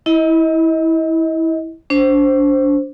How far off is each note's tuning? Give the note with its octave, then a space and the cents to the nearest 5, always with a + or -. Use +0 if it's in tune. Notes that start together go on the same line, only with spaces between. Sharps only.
E4 -15 D#5 +30
D4 -30 C5 +0